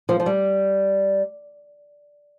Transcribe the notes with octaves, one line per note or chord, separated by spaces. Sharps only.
F3
F3
G3